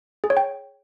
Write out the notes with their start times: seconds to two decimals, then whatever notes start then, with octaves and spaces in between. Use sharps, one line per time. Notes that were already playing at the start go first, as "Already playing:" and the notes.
0.24 G#4
0.30 C#5
0.37 G5